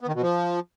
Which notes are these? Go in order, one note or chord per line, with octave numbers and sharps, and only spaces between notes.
B3
D#3
B2
F3